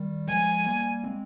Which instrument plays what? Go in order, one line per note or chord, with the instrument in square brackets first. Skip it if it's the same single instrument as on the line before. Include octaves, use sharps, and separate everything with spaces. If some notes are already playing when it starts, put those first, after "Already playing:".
Already playing: [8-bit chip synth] D#3 G3
[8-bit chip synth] F3 G#3 [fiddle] G#5
[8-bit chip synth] G3 A#3
G#3 C4